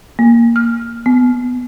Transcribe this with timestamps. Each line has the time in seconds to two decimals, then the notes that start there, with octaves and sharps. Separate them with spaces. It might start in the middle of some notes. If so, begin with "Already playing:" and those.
0.19 A#3
0.56 F6
1.06 B3